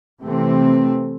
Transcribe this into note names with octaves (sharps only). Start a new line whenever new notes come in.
C3 E3 A3 C4